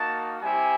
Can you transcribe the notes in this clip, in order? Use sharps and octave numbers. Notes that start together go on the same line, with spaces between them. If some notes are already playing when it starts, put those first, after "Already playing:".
Already playing: A#3 D#4 F#4 A5
G3 C4 E4 G4 G#5